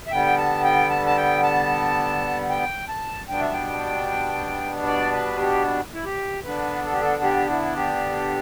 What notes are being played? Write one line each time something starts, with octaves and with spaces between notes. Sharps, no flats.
E5
D3 G3 B3 G5
A5
G5
A5
A5
G5
A5
G5
A5
B2 G3 B3 D4 G5
E5
G5
D5
B4
G4
E4
G4
D3 B3 D4 B4
A4
G4
A4
G4
E4
G4